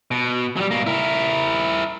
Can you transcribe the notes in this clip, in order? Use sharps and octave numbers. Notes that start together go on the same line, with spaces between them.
B2
F#3 G3
B2 A#3
E4 A#4